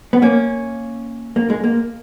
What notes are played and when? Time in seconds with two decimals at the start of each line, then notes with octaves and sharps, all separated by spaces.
0.13 B3
0.22 A#3 C#4
1.36 A#3
1.50 G#3
1.64 A#3